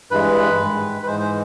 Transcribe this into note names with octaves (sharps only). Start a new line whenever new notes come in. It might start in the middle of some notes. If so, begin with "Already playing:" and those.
G2 E3 G#3 B4
G#2 D#3 G#3
B4
G#2 E3 G#3 C5
C5